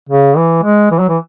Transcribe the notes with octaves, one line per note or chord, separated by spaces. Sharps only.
C#3
E3
G#3
E3
F#3
E3